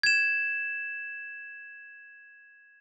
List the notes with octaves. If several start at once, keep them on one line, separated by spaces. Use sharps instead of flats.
G#6 E7